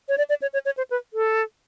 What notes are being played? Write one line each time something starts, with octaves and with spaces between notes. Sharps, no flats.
C#5
D5
D5
C#5
C#5
C#5
C5
B4
A4